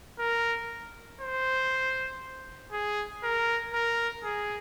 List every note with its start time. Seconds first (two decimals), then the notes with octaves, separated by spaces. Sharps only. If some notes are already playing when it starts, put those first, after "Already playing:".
0.19 A#4
1.21 C5
2.73 G#4
3.23 A#4
3.74 A#4
4.24 G#4